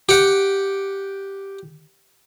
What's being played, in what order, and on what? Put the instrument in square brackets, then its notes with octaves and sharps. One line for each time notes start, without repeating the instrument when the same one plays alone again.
[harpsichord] G4 F#5